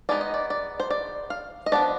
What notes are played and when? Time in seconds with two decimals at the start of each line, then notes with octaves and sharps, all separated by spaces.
0.09 G#3 B3 D#4 D5
0.21 D#5
0.34 D5
0.50 D5
0.80 C5
0.90 D5
1.30 F5
1.66 D#5
1.72 F3 B3 D4 D5